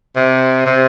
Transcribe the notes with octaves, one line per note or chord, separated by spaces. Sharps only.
C3
C3